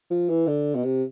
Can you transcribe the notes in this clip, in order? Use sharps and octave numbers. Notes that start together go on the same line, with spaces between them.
F3
E3
D3
B2
C3